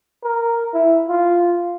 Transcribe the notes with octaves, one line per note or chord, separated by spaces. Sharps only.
A#4
E4
F4